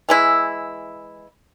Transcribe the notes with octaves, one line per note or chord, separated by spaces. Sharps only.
E3 G#3 E4